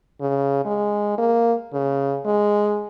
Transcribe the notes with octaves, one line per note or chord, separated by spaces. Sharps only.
C#3
G#3
A#3
C#3
G#3